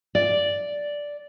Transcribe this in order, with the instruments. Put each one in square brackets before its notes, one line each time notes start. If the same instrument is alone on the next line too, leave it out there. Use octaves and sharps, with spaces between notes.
[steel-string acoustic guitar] D5